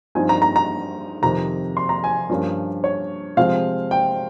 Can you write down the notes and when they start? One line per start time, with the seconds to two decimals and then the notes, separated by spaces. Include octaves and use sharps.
0.15 G2 F3 C4 D#4 G#5
0.29 A#5
0.42 A#5
0.56 A#5
1.22 F2 C3 D#3 A#5
1.77 C6
1.89 A#5
2.04 G#5
2.29 G2 F3 A#3 C#4
2.84 C#5
3.37 C3 F3 G#3 C4 F5
3.91 G5